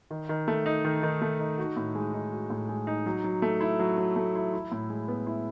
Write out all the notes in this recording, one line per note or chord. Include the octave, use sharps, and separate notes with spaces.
D#3
D#3
A3
D#4
D#3
D#3
A3
D#4
F#4
A2
G#3
D#4
F#4
A2
G#3
D#4
F#3
F#3
A3
E4
F#3
F#3
A3
E4
E4
A2
G#3
B3
E4